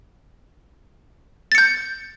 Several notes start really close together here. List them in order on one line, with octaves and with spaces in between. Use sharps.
A6 C#7 G6